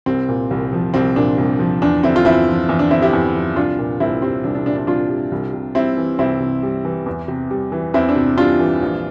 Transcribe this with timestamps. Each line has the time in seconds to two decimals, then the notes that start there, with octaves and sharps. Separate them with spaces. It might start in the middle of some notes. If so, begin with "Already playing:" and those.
0.06 C2 C4
0.29 A#2
0.51 C2
0.73 F3
0.94 C2 C4
1.16 A#2 D4
1.38 C2
1.59 F3
1.82 E2 D4
2.03 D3 C4 E4
2.16 F4
2.25 E2 C4 E4
2.48 F3
2.69 E2
2.79 D4
2.91 D3 C4 E4
3.02 E4 G4
3.13 E2
3.35 F3
3.56 C2 D4 F4
3.78 A#2
4.00 C2 C4 E4
4.22 G3 C4
4.44 C2 D4
4.55 D4
4.66 A#2 D4
4.77 D4
4.87 C2 D4 F4
5.10 G3
5.32 C2
5.53 C3
5.75 G3 C4 E4
5.98 E3
6.19 C2 C4 E4
6.40 C3
6.63 G3
6.85 E3
7.06 E2
7.28 C3
7.51 G3
7.72 E3
7.94 E2 C4 E4
8.09 D4
8.16 C3
8.38 G3 D4 F4
8.60 E3
8.82 A#1